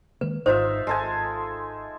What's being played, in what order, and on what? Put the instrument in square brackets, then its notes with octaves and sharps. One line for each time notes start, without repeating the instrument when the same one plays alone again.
[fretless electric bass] D#3 G#3 A#3 [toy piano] B4
[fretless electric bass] G#1 G#2 [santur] D#4 F4 E5 [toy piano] C5
[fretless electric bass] G#1 [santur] G#3 A4 G#5